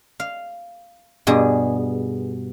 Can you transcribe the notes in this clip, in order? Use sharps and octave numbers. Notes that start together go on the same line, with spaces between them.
F5
G2 B2 G#4